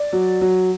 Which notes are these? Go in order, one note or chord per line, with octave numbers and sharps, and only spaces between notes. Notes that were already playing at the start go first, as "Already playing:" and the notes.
Already playing: D5
F#3
F#3